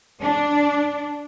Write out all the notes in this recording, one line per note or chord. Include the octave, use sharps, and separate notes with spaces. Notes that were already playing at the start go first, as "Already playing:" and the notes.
D4